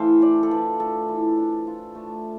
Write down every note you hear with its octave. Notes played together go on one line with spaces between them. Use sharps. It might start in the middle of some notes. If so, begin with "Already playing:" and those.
Already playing: E3 A3 A4 C5 F5
D4 D5
A4
F4 B4
A3 A4
E3
D4
F4
A3